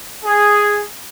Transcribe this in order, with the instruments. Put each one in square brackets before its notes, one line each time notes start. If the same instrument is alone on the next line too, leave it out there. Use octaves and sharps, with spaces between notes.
[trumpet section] G#4